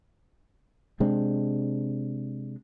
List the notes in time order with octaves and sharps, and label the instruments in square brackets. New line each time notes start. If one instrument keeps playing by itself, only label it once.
[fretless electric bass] C3 G#3 C4 D4